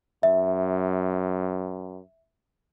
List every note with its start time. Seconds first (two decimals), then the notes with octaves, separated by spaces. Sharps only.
0.23 F#2 E5